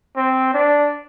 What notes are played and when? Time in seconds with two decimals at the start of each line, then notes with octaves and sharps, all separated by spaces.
0.16 C4
0.54 D4